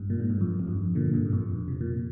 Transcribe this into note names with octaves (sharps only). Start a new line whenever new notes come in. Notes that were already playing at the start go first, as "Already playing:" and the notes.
Already playing: G2
A#2
G#2
G2
F2
F2
G2
A#2 D3
G2 A#2
G2
F2
C3
A#2